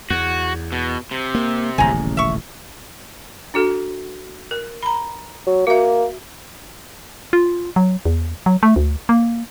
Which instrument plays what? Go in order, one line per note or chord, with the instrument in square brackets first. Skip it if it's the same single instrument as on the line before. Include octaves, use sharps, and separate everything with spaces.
[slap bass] E2 [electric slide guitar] F#4
[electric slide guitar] B2
C3
[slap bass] A#3
[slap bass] D#1 A1 C#3 [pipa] G#5 A#5
[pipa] E5 C#6
[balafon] D4 F#4 A4
A#4
A#5 B5
[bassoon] F#3
[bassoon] A#3 [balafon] F#4 E5
[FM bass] F4
F#3
E2
F#3
A3
D2
A#3